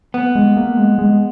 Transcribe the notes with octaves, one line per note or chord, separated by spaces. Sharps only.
B3
G#3
A#3
G#3
G#3